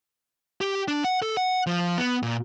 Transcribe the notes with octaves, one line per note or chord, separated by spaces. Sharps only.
G4
D4
F#5
A4
F#5
F3
B3
A#2